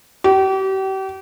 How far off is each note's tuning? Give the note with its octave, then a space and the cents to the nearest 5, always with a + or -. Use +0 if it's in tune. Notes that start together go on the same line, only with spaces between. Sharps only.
G4 -35